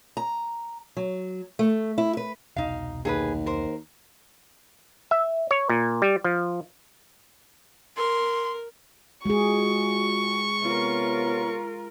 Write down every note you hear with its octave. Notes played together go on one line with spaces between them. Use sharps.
A#5
F#3
A3
E4
B4
E1 C2 B2 D#4 F5
D#2 G#4 A4 B4
A#4 C5
E5
C#5
A#2
G3
F3
A#4 C6
G#3 F4 F#4 G#4 C#6
C3 B3 F4 A#4 C#5